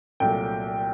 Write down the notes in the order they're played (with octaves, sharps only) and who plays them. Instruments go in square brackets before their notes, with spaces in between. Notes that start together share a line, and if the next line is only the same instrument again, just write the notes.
[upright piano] C2 A#2 F#3 A3 G5